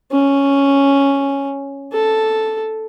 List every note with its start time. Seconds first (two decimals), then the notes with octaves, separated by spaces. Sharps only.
0.12 C#4
1.92 A4